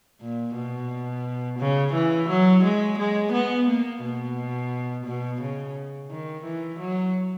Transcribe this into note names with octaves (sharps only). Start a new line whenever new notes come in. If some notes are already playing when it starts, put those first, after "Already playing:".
A#2
B2
C#3
E3
F#3
G#3
G#3
B3
A#3
B2
B2
C#3
D#3
E3
F#3